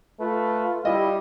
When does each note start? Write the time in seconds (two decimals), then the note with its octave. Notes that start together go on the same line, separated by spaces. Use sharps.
0.20 A3 F4 B4
0.85 G3 E4 D#5